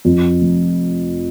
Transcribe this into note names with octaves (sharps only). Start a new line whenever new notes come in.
F2
F1